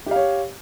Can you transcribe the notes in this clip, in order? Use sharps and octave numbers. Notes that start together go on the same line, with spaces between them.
G4 C#5 F5